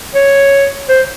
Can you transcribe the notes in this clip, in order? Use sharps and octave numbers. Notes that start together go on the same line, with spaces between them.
C#5
C5